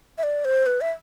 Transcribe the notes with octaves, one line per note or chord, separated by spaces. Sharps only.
E5
D5
C5
B4
E5